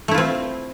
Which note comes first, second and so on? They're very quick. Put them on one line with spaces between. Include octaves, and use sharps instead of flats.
A3 E4 F4 C4